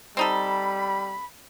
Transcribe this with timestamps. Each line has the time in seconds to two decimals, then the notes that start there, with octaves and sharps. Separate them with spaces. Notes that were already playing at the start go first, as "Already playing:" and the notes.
0.17 G3 C4 D#4 A4 B5